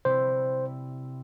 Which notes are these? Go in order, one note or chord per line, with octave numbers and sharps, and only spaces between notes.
C3 G3 C4 E4 C5